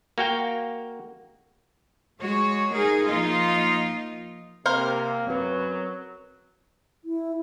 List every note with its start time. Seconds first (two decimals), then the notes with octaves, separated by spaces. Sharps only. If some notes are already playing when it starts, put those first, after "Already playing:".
0.18 A#3 F#4 F5 G5
2.20 G#3 F#4 C#5
2.73 D#4 G#4 A#4
3.07 F3 A#3 D#4 F4 D#5
4.66 C3 A#3 C4 A#4 C5 F5
5.27 F#2 F#3 C4 B4
7.04 E4